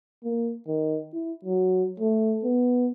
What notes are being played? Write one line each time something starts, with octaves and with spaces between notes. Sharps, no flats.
A#3
D#3
E4
F#3
A3
B3